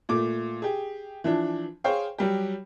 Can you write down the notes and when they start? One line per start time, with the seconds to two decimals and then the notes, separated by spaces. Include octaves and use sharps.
0.09 A#2 A3 D6
0.62 G4 G#4
1.24 E3 F3 D4
1.84 G#4 C5 C#5 F5 G5
2.18 F#3 G3 G4